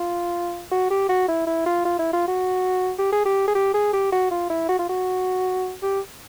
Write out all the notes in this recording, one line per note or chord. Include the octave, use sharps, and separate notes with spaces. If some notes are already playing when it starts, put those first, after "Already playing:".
Already playing: F4
F#4
G4
F#4
E4
E4
F4
F4
E4
F4
F#4
G4
G#4
G4
G#4
G4
G#4
G4
F#4
F4
E4
F#4
F4
F#4
G4